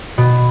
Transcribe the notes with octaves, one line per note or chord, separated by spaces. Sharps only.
B2